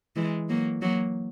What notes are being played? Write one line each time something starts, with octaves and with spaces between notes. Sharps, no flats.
E3 G#3
F#3 A#3
F#3 A#3